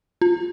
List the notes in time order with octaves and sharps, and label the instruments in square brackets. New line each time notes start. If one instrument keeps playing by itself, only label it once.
[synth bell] F4